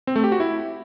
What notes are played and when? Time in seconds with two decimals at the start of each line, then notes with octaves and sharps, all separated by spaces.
0.07 C4
0.16 A3
0.24 G4
0.32 F#4
0.40 E4